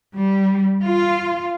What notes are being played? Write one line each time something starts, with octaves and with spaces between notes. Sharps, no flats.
G3
F4